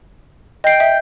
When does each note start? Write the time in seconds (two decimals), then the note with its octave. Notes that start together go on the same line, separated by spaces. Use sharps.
0.64 D#5 G5 C7
0.80 E5